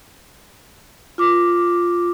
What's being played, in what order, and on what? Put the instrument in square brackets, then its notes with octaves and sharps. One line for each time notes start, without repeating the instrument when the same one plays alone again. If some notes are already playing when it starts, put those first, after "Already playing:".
[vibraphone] F4 D6